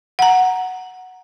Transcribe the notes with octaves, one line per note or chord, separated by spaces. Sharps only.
F#5 A#5